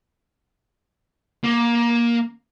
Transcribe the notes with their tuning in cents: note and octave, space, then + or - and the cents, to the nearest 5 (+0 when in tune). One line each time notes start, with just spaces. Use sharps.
A#3 +15